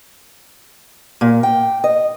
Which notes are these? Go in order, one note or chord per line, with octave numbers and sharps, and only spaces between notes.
A#2
G5
D#5